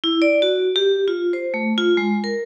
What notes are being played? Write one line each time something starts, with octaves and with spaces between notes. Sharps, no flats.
E4
D5
F#4
G4
F4
C5
A3
F4
G#3
A#4